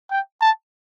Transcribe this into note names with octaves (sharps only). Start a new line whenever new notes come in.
G5
A5